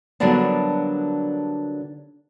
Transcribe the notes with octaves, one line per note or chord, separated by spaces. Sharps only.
D3 F#3 G3 A#3 B3 D4